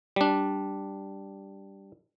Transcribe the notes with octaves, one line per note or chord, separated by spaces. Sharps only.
G3 D4